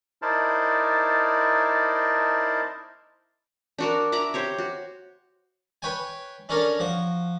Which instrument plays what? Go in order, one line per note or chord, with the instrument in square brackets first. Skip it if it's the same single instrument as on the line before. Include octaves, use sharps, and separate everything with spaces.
[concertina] D#4 E4 A#4 C5 D5 A5
[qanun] D4 F#4 A#4
E5 A#5 B5 D6
G4 C5 C#5
F#4
[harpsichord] B4 C#5 G5 G#5
C#4 D4 A4 A#4 C#5
F3 F#4